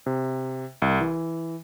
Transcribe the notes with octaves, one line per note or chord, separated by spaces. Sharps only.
C3
C2
E3